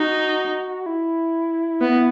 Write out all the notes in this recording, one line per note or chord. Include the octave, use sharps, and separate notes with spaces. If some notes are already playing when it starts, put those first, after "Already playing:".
Already playing: D#4 F#4
E4
B3